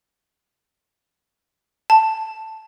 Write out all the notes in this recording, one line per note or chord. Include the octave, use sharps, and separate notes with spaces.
A5